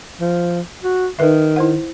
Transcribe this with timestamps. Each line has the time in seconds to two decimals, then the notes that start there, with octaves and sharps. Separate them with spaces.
0.20 F3
0.84 F#4
1.19 D#3 D#4 B4 E5
1.56 E4 C5 F#5